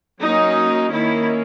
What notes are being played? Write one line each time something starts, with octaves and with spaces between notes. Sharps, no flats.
F#3 A#3 C#4 D#4
D#3 A#3 C#4 E4